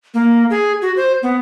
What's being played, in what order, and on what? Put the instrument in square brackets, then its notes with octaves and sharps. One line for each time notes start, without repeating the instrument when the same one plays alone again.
[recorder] A#3
G#4
F#4
C5
B3